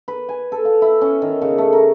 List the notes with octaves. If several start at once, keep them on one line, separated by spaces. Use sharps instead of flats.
B4
G#5
A4
F5
E4
C#4
D#3
C#3
A3
A#4